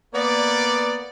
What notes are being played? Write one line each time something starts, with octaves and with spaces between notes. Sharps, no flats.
A#3 B3 D5